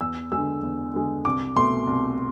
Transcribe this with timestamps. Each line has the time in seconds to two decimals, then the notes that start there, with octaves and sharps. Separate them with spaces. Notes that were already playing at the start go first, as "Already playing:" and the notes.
0.01 E2 E6
0.32 D3 G#3 E6
0.63 E2
0.94 D3 G#3
1.25 C2 D6
1.56 B2 A3 C6
1.87 C2